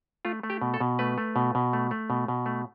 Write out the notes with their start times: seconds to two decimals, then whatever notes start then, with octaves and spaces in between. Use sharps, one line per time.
0.25 A3 F4
0.43 A3
0.50 G4
0.62 B2
0.74 A4
0.80 B2
0.99 A3 B4
1.18 A3
1.36 B2
1.55 B2
1.73 A3
1.91 A3
2.10 B2
2.28 B2
2.46 A3